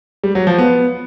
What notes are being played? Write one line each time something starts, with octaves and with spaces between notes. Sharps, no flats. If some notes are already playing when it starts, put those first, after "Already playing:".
G3
F#3
F3
B3